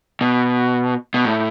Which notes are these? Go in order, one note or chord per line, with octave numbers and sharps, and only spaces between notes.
B2
B2
A2